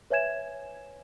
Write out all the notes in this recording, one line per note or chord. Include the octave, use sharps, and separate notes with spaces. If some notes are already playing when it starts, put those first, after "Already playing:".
B4 C#5 E5 G#5 G#6 E7